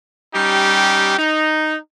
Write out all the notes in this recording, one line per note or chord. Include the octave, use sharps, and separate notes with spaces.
G3 C#4 D#4 G4
D#4